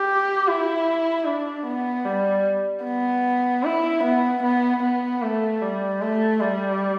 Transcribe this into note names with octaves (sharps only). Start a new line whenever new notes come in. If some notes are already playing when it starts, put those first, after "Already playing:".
Already playing: G4
E4
D4
B3
G3
B3
E4
B3
B3
B3
A3
G3
A3
G3